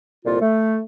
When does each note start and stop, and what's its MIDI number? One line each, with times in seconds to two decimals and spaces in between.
0.24 0.38 36
0.24 0.38 41
0.24 0.38 46
0.24 0.38 65
0.41 0.79 57